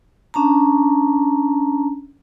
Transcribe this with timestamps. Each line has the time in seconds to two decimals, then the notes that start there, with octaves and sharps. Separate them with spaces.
0.34 C#4 D4 A5 A#5